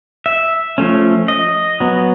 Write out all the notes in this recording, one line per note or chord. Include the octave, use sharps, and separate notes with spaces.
E5
F3 A3 C#4
D#5
F#3 B3